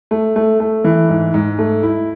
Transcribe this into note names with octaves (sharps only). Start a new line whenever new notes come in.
A3
A3
A3
E3
G#2
G#2
A3
E4